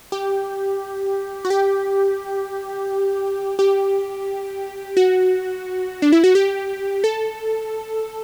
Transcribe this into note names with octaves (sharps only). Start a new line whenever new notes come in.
G4
F#4
G4
G4
F#4
D4
E4
F#4
G4
A4